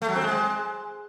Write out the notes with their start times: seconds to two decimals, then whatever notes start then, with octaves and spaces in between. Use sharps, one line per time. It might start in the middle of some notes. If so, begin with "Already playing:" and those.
0.02 A3
0.09 F#3
0.15 C4
0.22 G#3